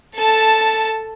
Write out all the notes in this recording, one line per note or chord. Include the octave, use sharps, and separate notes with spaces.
A4 A5